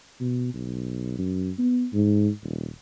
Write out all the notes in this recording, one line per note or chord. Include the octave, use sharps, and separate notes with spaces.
B2
B1
F#2
B3
G#2
D#1